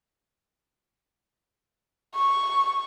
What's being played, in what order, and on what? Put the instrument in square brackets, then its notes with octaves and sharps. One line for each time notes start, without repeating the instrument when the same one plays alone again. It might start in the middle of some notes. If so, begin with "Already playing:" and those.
[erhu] C#6